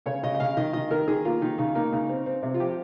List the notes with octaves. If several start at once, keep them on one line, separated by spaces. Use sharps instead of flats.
C#3 C#5
C#3 D#5
D#5
C#3 F5
D#3 D#5
D#3 D#5
D#3 A#4
D#3 G#4
A#3 F4
D#3 D#4
C#3 D#4
A#3 D#4
C#3 D#4
C4
C4
C3
F4
F3 G4